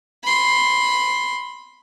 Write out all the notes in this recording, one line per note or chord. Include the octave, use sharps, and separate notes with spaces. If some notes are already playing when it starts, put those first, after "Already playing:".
B5 C6